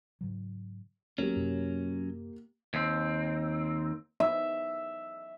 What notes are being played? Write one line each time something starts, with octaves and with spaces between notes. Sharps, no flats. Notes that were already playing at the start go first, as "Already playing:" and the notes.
G#2 C#3 F#3
D#1 F#3 A#3 B3 C#4 G4
F#2 C3
D#2 C4
E5